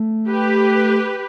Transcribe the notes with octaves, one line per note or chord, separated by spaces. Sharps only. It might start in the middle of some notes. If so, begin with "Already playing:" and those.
Already playing: A3
G4 B4